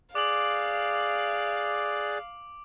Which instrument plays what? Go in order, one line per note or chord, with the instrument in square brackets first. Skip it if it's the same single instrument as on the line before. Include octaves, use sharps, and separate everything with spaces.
[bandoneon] G#4 D5 F#6 [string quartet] F5 [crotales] D6 D7 F#7